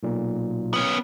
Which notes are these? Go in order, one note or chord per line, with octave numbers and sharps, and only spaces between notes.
B1 A#2
B3 C#4